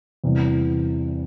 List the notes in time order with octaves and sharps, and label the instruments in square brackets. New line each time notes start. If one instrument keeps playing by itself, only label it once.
[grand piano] E2 C3 E3 G3